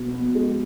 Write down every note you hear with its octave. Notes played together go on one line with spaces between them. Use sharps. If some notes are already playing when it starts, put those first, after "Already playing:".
Already playing: B2 B3
B3
G#3